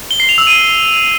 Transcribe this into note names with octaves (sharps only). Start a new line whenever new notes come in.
G7
C7
F7
E6
D#7